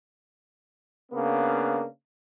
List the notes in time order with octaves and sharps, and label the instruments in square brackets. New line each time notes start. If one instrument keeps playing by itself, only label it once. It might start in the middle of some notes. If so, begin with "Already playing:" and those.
[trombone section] C#3 A#3 B3 D4